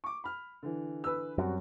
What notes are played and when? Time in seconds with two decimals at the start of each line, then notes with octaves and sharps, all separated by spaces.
0.04 C#6 D6
0.24 B5 F6
0.63 D3 E3
1.04 B4 E6
1.38 F#2 G3 C4 F#4